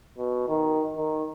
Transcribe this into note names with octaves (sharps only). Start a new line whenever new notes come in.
B2
D#3
D#3